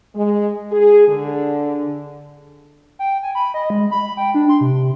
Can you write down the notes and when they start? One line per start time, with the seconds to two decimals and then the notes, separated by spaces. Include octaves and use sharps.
0.15 G#3
0.72 G#4
1.08 D3
2.99 G5
3.23 G#5
3.35 B5
3.54 D#5
3.70 G#3
3.91 B5
4.17 G5
4.34 D4
4.49 C6
4.61 C3